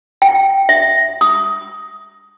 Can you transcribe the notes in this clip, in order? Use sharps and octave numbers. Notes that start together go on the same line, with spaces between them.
G5
E5
D#6